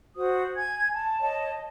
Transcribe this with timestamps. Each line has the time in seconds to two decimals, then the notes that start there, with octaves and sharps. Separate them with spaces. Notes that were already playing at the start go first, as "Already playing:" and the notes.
0.17 F#4 C5 D#6
0.56 G#5 G#6
0.92 A5
1.20 C#5 D#5 A5